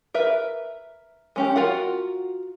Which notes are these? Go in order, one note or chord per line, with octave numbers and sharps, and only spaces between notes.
A#4 B4 E5
G#3 C#4 G4
F4 F#4 A#4 F#5